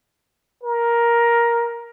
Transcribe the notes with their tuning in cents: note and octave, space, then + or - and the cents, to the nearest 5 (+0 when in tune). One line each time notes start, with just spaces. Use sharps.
A#4 +10